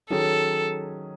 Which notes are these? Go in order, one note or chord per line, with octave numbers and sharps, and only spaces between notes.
D#3 F#3 C#4 G#4 A4